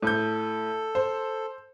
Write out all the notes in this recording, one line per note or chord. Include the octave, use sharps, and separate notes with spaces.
A2 A4 G6
C5